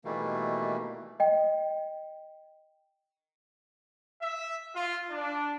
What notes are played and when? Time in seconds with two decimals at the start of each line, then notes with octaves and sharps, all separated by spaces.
0.05 B2 D#3 E3 G3 A3 A#3
1.20 D#5 G5
4.22 E5
4.75 F4
5.10 D4